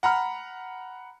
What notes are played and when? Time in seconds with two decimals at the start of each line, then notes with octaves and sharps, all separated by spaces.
0.03 F#5 A#5 B5 F6